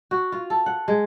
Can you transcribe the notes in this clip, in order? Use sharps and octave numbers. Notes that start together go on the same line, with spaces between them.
F#4
F4
A4
F#5
G#3